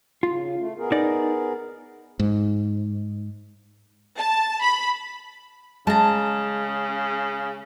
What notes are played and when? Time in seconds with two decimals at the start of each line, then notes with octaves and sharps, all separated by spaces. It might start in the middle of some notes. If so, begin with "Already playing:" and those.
0.23 C#3 F4
0.58 A3
0.78 B3 G#4 A#4
0.92 D#4 D5
2.20 G#2
4.19 A5
4.62 B5
5.87 C#3 G#3 A5 A#5